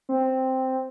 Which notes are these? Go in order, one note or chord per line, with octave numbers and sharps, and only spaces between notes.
C4